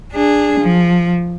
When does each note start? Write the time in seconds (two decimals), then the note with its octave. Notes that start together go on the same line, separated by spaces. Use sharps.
0.12 D4 G#4
0.60 F3